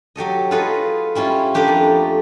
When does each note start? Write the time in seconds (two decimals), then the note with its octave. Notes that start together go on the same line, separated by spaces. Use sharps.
0.16 F#3 G4 A4 D#5
0.51 F4 G#4 A4 B4 C#5 D#5
1.15 G3 C#4 E4 F4
1.54 A3 A#3 D4 G4 G#4
1.68 F2